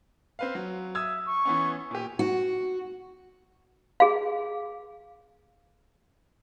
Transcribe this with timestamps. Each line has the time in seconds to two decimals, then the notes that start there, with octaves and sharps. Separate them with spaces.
0.39 C4 B4 F5
0.55 F#3
0.95 E5 D#6 E6 G#6
1.25 C#6
1.45 E3 B3 C#4
1.91 A#2 G4 G#5
2.19 F#4
4.00 G#4 F5